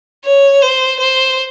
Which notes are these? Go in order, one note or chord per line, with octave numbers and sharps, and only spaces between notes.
C#5
C5
C5